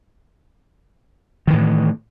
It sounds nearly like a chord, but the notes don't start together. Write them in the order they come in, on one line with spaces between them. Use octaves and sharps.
D#3 E3 A2